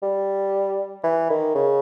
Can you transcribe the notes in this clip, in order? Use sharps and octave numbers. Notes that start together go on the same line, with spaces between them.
G3
E3
D#3
C#3